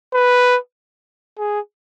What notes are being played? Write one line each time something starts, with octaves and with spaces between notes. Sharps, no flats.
B4
G#4